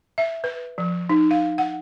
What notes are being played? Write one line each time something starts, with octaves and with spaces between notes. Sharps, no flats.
E5
B4
F3
D#4
F5
F#5